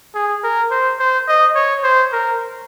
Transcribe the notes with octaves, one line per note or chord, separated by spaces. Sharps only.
G#4
A#4
C5
C5
D#5
C#5
C5
A#4